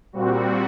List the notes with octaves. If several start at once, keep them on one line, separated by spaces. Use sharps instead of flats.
A#2 G3 C4 F#4